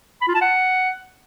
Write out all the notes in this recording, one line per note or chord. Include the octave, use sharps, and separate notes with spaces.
B5
F4
A5
F#5